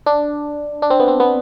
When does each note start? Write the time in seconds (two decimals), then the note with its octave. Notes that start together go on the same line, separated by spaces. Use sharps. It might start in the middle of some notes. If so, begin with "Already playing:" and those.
0.06 D4
0.82 D4
0.90 C4
1.00 B3
1.08 C4
1.20 B3